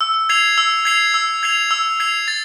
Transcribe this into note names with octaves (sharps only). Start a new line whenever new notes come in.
E6
G#6 C7 F7
E6
G#6 C7 F7
E6
G#6 C7 F7
E6
G#6 C7 F7
A6